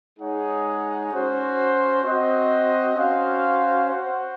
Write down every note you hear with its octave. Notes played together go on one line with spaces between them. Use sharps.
G#3 D#4 G#4 C#5 F#5
C#4 F#4 C5
C4 F#4 C5 D#5
C#4 F#4 C5 F5
F#4 C5 F#5